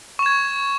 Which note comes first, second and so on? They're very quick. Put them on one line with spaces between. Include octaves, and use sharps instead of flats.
C#6 E7 G#6